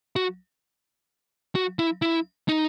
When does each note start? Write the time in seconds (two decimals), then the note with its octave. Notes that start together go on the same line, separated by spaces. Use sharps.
0.16 F#4
1.55 F#4
1.79 E4
2.02 E4
2.48 D#4